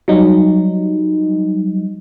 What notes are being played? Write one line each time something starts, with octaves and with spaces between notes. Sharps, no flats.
F#3 G3 D#4